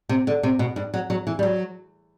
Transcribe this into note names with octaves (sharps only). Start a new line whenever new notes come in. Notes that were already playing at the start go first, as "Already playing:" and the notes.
C3
D3
C3
B2
G2
F#3
F#3
E3
G3
F#3